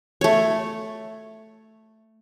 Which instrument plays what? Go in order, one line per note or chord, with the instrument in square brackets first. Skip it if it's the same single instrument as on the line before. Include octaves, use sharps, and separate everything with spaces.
[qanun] A3 C#5